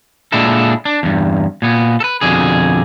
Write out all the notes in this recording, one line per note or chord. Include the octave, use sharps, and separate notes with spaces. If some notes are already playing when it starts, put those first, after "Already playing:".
A#2 G#3 D4 E4 A4
D4
E2 G2
A#2 B3
A4 B4
F2 B2 D3 G#4